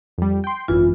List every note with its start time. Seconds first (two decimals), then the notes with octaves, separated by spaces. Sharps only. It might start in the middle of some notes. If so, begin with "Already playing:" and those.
0.18 F2 G3
0.44 G5 C6
0.68 G#1 F#2 E3 F4